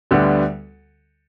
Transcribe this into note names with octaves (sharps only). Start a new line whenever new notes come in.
D2 D3 G3 B3 D4